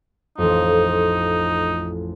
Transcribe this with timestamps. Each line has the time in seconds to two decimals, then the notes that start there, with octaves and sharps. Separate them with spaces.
0.38 A1 F2 D#4